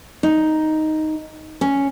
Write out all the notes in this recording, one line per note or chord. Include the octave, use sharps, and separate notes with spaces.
D#4
C#4